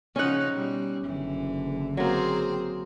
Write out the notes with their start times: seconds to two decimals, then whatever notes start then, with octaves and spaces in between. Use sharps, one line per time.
0.16 C#3 F3 C#4 D#4 F#5
0.52 B2 G3
1.05 F#1 D3 E3
1.97 F#3 A#3 C4 G#4 C5